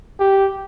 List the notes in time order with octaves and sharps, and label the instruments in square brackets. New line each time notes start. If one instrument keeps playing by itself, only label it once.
[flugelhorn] G4